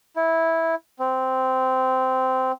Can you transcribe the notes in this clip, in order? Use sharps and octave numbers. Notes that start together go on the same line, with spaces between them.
E4
C4